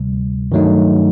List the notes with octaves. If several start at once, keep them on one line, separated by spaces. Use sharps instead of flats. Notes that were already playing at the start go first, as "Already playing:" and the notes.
Already playing: D2 C3 G3
G2 D#3 F#3 A3 D#4